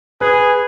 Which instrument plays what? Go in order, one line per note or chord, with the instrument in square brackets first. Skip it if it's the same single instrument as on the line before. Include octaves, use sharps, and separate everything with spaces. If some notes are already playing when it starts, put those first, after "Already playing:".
[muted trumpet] G#4 [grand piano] B4